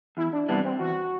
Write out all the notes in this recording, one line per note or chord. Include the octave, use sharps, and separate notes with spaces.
E2 E4
D4
C3 E3 G3 B3 D4
C4
E2 F#4